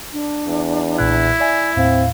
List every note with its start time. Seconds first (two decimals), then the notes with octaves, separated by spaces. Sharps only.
0.13 D4
0.48 E2
0.98 B1 A#2 E4 F#6
1.40 D5 E5 G#5
1.77 D#2 A2 C4 F5